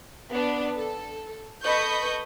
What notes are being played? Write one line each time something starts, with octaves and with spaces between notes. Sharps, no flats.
B3 D4
A4
A4 B4 D#5 B5 C#6 G6